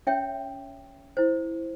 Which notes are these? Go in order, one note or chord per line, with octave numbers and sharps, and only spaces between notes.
C#4 C#5 E5 G5
E4 C5